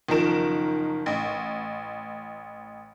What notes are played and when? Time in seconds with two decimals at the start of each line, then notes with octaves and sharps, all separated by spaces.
0.08 F#1 D#3 F3 A#4 E7
1.06 A1